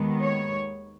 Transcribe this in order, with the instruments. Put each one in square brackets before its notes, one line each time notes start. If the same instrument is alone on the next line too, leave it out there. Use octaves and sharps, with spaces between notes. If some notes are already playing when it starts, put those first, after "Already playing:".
Already playing: [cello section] D#2 D#3 G#3 B3
C#5